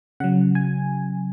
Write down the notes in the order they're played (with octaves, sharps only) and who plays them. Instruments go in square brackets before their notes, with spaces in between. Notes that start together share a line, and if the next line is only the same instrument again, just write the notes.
[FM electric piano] C#3 F#3 F#5
G#5